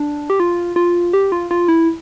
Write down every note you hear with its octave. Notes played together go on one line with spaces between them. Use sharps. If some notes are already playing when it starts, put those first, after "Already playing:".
Already playing: D4
G4
F4
F4
G4
F4
F4
E4